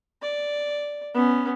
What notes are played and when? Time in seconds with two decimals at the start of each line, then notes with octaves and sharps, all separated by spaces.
0.22 D5
1.15 B3 C#4